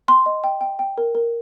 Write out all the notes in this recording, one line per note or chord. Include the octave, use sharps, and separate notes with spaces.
G5 C6
D#5
G5
G5
G5
A#4
A#4